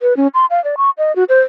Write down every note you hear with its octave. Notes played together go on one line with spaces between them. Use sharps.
B4
C#4
C6
F5
D5
C#6
D#5
F#4
C5